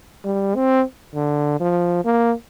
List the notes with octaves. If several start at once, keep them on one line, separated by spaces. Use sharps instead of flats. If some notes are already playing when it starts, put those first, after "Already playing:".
G3
C4
D3
F3
A#3